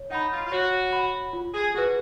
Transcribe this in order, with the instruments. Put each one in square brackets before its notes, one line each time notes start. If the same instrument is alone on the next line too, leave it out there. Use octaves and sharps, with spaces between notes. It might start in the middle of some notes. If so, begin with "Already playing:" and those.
Already playing: [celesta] C#5
[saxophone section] D#4 [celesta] F#5 B5
[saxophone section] F4
F4
[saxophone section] F#4 [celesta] C#5
[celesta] F#5 B5
F4
[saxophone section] G#4
[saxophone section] F#4 [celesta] G#4 B4